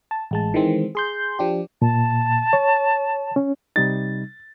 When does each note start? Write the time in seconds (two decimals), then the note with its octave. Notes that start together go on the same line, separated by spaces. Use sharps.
0.11 A5
0.31 A1 G#3 A5
0.54 D#3 E3 G#3 C4
0.95 G#4 C6 G6
1.39 F3 D4 G4
1.82 A#2 A5
2.53 C#5
3.36 C#4
3.76 C3 G3 D#4 A6